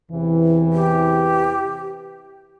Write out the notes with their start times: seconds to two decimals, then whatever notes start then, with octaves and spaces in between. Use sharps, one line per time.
0.12 E2 C3 E3
0.73 G4